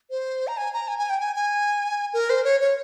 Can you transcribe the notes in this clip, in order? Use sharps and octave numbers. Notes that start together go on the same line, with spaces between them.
C5
A#5
G#5
A#5
G#5
G#5
G5
G#5
G#5
A#4
C5
C#5
C#5